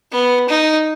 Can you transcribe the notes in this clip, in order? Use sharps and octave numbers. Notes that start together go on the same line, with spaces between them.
B3
D#4